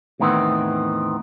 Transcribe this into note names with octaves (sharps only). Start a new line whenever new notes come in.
E2 A2 D#3 B3 C4